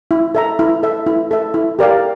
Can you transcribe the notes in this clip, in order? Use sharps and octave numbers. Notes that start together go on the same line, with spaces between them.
E4
A4 E5 A#5
E4
A4 E5
E4
A4 E5
E4
G4 A#4 D5 F5